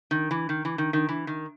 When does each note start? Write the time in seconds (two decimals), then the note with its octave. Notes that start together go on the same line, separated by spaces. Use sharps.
0.11 D#3
0.31 E3
0.49 D#3
0.65 E3
0.78 D#3
0.93 D#3
1.09 E3
1.27 D#3